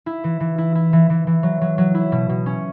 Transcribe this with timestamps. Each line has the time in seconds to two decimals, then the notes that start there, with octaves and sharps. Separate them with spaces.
0.06 E4
0.24 E3
0.40 E3
0.58 E4
0.75 E4
0.93 E3
1.10 E3
1.27 E3
1.43 F#3
1.61 F#3
1.78 F#3
1.94 E4
2.12 B2
2.29 B2
2.46 C#4